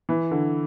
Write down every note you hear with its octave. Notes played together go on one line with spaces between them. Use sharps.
E3
D3